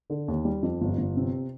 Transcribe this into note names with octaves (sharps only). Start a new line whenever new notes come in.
D3
D#2
G3
F2
G1
G1
C3